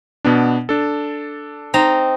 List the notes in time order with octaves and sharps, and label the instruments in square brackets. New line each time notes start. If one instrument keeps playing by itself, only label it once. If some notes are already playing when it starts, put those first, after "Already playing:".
[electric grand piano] B2 B3 D4
D4 A4
[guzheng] C4 D#4 A#5